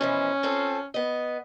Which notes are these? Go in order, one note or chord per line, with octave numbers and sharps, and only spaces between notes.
B2 E3 F3 C#4
C4 F4 A4
B3 D#5